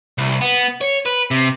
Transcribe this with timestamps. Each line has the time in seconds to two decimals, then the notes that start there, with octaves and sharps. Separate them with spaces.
0.18 C2
0.41 B3
0.81 C#5
1.06 B4
1.31 C3